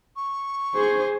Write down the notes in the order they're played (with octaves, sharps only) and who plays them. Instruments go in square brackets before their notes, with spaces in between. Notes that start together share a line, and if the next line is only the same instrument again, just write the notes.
[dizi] C#6
[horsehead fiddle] G#4 C5